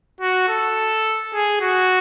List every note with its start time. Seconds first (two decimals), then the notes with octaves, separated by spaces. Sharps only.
0.21 F#4
0.49 A4
1.34 G#4
1.61 F#4